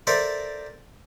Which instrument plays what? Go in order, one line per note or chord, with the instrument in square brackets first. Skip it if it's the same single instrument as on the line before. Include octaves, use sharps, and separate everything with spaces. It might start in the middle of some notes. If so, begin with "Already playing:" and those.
[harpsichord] A4 A#4 C5 D5 E5